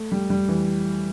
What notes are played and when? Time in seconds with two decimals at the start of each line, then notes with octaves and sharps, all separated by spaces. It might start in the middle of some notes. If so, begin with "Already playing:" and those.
Already playing: A3
0.12 G3
0.30 G3
0.49 E3